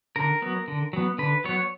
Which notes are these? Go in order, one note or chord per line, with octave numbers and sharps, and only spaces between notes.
D3 A#4
F#3 B3
D3
F#3 B3
D3 B4
F#3 B3 C#5